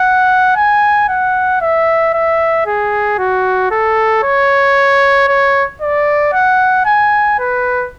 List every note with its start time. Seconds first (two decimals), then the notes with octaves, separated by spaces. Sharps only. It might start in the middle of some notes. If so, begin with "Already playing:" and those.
Already playing: F#5
0.56 G#5
1.09 F#5
1.61 E5
2.14 E5
2.66 G#4
3.19 F#4
3.71 A4
4.23 C#5
5.28 C#5
5.82 D5
6.33 F#5
6.86 G#5
7.39 B4